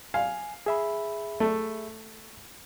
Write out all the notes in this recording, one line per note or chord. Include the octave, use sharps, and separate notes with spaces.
F5 G#5
G#4 E5 B5
A3